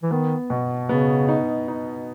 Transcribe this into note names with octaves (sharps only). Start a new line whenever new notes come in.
E3
D#3 B3
B2
C#3 B3
D#4
D#4